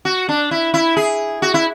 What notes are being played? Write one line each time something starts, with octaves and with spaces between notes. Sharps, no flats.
F#4
D4
E4
E4
G#4
F#4
E4